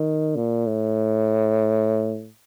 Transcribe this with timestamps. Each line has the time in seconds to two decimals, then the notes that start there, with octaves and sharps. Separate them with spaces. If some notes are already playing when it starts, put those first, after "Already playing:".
Already playing: D#3
0.35 A#2
0.67 A2